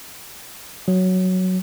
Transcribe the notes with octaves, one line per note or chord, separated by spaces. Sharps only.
F#3